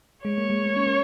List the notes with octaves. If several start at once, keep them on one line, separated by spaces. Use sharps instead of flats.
G#3 C#5
A#3
G#3
A#3
C#4
A#3